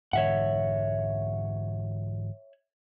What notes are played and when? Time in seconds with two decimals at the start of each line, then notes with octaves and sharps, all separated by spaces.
0.13 G#2 D3 E3 C#5 E5 F#5